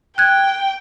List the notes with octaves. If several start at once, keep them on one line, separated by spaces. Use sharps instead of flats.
G5 F#6 G#6